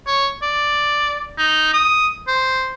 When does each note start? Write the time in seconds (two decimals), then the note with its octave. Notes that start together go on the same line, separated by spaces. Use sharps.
0.07 C#5
0.43 D5
1.38 D#4
1.73 D#6
2.28 C5